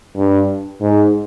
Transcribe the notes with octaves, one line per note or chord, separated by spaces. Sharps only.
G2
G#2